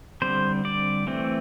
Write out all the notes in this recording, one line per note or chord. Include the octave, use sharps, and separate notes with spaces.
D3 G3 C4 C5
D5
E3 A3 C4